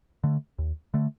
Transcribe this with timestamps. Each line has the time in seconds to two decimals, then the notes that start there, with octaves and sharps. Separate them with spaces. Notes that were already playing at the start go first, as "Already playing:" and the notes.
0.24 D3 A3
0.58 D#2
0.94 D3 A3